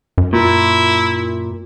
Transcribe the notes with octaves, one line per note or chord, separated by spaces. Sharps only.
F#2
A#2 E4